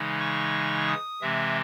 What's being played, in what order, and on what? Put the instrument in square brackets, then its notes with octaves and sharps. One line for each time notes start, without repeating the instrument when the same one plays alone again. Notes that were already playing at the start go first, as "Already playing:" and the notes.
Already playing: [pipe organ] C#3 E3 G#3 D#4
C#6
D#6
C3 E3 G#3 C4 E5